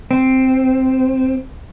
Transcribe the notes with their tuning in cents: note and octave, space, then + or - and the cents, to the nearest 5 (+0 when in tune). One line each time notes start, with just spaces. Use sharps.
C4 +0